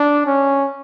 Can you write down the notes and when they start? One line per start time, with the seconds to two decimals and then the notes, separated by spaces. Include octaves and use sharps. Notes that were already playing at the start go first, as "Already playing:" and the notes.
Already playing: D4
0.26 C#4